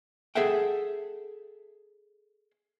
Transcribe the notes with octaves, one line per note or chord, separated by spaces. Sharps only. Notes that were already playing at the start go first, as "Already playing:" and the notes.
G#4 A4 E5 F#5 G5